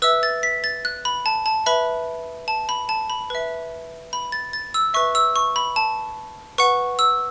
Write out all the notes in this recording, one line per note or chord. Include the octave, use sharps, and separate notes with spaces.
B4 E5 E6
A6
B6
A6
F#6
B5
A5
A5
B4 E5 B5
A5
B5
A5
B5
B4 E5
B5
A6
A6
E6
B4 E5 C#6
E6
C#6
B5
A5
B4 F#5 C#6
E6